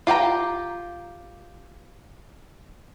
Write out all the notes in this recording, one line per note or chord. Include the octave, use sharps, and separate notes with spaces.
F4 G4 G5 A#5